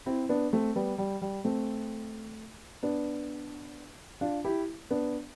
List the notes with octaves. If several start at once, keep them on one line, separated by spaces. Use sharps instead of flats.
C4 E4
B3 D4
A3 C4
G3 B3
G3
G3
A3 C4
B3 D4
D4 F4
E4 G4
B3 D4